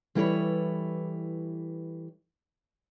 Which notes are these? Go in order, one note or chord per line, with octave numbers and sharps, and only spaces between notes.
E3 G3 E4 A4 B4 C#5